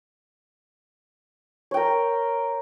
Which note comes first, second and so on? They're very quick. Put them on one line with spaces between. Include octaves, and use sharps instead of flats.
C#5 G5 A#4